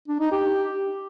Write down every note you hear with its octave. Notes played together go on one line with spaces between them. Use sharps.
D4
D#4
G4